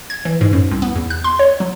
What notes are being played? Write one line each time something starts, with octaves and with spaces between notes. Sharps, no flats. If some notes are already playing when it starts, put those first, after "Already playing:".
G#6
E3
G#2
F#2
C2
B3
E2
F#6
C6
C#5
F#3